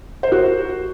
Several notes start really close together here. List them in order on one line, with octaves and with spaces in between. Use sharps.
C5 A#4 F#4